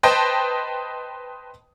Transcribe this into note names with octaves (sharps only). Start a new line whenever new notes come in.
B4 C5 D#5 G5 A5